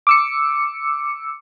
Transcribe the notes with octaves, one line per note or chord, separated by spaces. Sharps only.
D6 E6 C#7